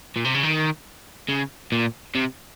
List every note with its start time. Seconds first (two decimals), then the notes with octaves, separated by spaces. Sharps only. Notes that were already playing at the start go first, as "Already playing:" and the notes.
0.16 A#2
0.25 C3
0.34 C#3
0.43 D#3
1.29 C#3
1.72 A#2
2.15 C3